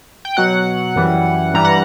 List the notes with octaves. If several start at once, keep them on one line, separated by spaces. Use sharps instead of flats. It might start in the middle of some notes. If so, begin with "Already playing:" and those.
G5
B2 F#3 F#5
F#2 E3 G3
G2 E3 G3 A#5
F#5